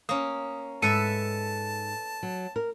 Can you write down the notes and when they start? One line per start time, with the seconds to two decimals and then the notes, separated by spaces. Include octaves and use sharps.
0.09 A#3 C#4 D#6
0.82 G#2 A4 B4 E5 A5 C#7 D#7
2.23 F#3
2.56 A#4